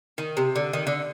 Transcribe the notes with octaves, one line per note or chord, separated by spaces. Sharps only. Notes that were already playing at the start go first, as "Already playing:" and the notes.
D#3
C3
D3
D#3
D3